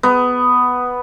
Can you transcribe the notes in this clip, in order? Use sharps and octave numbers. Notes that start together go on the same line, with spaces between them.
B3